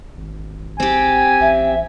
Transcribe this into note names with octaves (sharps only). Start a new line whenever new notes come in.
G#1
C4 G4 G#5
A1 E5